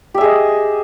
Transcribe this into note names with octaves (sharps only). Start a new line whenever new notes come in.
G4 G#4 D#5 E5